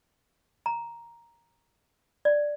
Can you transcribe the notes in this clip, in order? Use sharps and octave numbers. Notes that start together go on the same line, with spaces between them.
A#5
D5